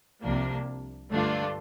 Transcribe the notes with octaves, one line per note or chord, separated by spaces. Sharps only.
C2 C3 F3 A#3 D4
G2 D3 A3 D4 F4